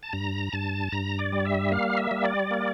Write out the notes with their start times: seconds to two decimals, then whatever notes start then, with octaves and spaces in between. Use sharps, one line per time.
0.03 A5
0.13 G2 A#5
0.53 G2 A5
0.92 G2 A#5
1.19 D5
1.32 G3
1.45 E5
1.72 A#3 F5
1.98 E5
2.11 G3
2.24 D5
2.51 A#3